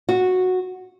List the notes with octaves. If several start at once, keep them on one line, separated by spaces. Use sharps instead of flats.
F#4